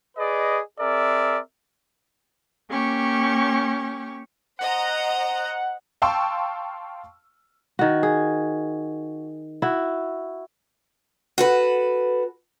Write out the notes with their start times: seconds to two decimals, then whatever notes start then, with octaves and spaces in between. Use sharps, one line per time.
0.18 G#4 B4 D5 D#5
0.80 C4 G#4 A#4 D5 E5
2.69 A#3 C#4 G4 C#6
4.59 C5 D#5 F#5 A#5
6.02 F5 G5 A5 C6 C#6 E6
7.79 D#3 F#4
8.03 G#4
9.62 E4 F#4
11.38 F#4 A4 B4